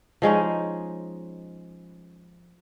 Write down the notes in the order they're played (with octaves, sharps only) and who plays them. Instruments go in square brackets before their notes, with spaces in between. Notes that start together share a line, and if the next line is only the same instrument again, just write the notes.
[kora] F3 G#3 C#4 D#4